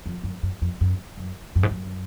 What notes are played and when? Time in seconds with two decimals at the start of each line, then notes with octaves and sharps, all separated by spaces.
0.06 F2
0.23 F#2
0.43 F#2
0.62 F2
0.81 F#2
1.18 F#2
1.55 F#2
1.63 G#2
1.71 F#2